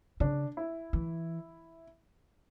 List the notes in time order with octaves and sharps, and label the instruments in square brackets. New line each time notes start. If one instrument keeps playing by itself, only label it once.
[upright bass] C#3 [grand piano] D4
[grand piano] E4
[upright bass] E3